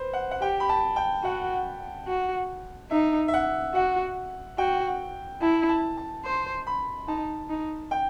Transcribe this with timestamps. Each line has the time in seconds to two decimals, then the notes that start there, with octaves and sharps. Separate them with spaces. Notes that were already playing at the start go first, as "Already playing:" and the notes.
Already playing: B4 C5
0.13 F#5
0.31 F#5
0.41 G4 G5
0.60 B5
0.69 A5
0.96 G5
1.24 F#4 F#5
2.08 F#4
2.91 D#4 E5
3.28 E5
3.34 F#5
3.75 F#4 F#5
4.58 F#4 G5
5.42 E4 A5
5.69 A5
5.97 A5
6.25 C5 C6
6.67 B5
7.08 D#4 A5
7.50 D#4
7.91 G5